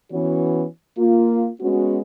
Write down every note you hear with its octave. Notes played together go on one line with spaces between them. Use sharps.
E3 B3 C#4 F#4 C#5
A#3 F4
G#3 B3 C#4 F#4